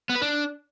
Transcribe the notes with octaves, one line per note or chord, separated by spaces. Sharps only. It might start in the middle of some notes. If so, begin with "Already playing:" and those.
B3
B4
D4